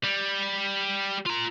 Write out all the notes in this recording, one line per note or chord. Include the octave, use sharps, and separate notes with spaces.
G3
F4 A#5